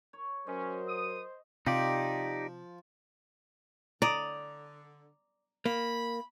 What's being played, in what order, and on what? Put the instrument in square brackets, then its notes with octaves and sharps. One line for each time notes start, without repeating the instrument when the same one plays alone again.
[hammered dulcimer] C#5
[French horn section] F#3 A#4 [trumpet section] C#4 [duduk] C5 [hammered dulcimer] D#5
[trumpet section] D#6
[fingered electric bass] C3 [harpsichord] F3 [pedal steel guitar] D#4 G4 D5
[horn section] D3 [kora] D5 [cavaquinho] A#5 D#6
[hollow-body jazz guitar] A#3 [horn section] B5